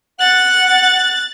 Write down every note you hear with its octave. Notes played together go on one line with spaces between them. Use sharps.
F#5 F#6 A6